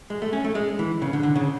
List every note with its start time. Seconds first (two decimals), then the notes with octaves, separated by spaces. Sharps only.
0.10 G#3
0.22 A3
0.33 C#4
0.44 A3
0.55 G#3
0.79 E3
1.02 C#3
1.13 D3
1.23 D3
1.35 C#3